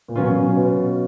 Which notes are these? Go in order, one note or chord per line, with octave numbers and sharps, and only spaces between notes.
A#2
B2 F#3 C#4 F4
B2